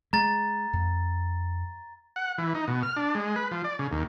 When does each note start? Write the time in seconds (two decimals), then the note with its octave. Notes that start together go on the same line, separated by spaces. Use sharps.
0.13 G#3 A#5 A6
0.73 F2
2.16 F#5
2.38 E3
2.55 D#4
2.67 B2
2.83 F6
2.96 D4
3.15 G#3
3.36 B4
3.51 F3
3.64 D5
3.79 C#3
3.92 D#2